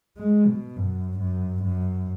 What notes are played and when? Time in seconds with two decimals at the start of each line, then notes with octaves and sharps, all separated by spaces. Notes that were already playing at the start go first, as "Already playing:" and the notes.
0.18 G#3
0.47 B2
0.76 F#2
1.20 F#2
1.64 F#2